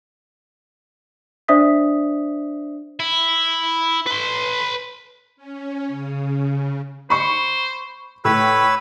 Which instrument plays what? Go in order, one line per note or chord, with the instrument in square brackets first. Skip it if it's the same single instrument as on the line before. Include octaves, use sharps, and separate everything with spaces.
[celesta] D4 C5 D5 E5 D#6 B6
[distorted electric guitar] E4
B4 C6
[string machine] C#4
C#3
[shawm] C5 [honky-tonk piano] B5 C#6
[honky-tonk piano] A2 [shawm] B4 [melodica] C#5 B5 E6